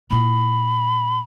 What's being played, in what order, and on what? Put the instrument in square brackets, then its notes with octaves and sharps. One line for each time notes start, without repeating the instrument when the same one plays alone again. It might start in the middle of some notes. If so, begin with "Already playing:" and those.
[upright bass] A#2 E4 [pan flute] B5